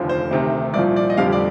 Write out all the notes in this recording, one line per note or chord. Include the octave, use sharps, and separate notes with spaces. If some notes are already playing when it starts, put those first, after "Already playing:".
Already playing: F1 D#2 D3 F3
C5
D2 C3 D#3
C2 A#2 F3 D5
D5
D#5
F1 F2 D3 G3 F5
D5